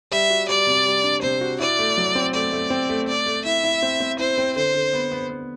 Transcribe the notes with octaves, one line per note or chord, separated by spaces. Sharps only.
G3 E5
F#4
G3 D5
C3
G3
D4
C3 C5
F#4
E4 D5
A3
F#3
C4
A3 D5
A3
C4
A3
A3 D5
A3
E4 E5
E4
C4
C4
E4 C5
C4
D3 C5
D3
B3
B3
B3